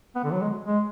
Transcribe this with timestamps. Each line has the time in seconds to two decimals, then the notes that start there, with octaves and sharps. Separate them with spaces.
0.16 B3
0.24 D3
0.32 F#3
0.41 G#3
0.67 G#3